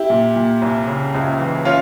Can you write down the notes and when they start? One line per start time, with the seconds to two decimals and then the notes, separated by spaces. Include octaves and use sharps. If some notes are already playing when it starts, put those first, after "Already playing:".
Already playing: E4 G4
0.10 A#2
0.36 A#2
0.62 C2
0.87 C#3
1.15 C#2
1.40 E3
1.65 C#4 F4